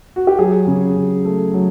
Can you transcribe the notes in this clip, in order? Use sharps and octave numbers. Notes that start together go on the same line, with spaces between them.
F#4
G4
F#3 G#4
C#3
C#3
A3
F#3